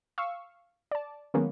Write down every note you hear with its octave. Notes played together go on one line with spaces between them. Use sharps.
F5 C#6 E6
D5 A5
D#3 F#3 G#3 A#3 B3 C#4